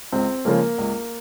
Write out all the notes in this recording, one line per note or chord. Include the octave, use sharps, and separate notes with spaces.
C#2 C4
C#3 F3 G#3 A#3 C#4
C#2